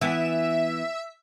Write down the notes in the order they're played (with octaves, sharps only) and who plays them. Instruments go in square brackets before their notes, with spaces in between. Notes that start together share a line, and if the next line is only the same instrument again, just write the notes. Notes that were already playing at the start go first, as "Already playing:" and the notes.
[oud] E3 B3 [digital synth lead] E5